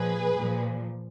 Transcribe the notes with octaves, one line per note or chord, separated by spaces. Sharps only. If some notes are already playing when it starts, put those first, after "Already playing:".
Already playing: A#2 F3 G#4 B4
A#2 F3